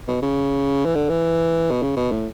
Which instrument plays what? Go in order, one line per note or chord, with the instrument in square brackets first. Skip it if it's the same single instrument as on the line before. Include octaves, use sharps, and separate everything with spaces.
[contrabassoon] B2
C#3
E3
D3
E3
B2
C#3
B2
A2